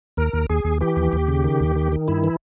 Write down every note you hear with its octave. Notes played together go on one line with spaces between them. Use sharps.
D#2 A#4
D#2
D#2 G#4
D#2
E3 G4
D#2
D#2
C#3
D#3
D#2
D#3
D#3
G2 E4
E3